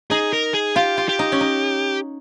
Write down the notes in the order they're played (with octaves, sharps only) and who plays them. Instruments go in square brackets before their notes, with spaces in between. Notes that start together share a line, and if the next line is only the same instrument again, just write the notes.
[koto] D#4 [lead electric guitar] G#4
[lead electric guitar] A#4
G#4
[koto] F4 [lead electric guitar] G4
[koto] F4
[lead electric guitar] G4
[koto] D#4
C#4
D#4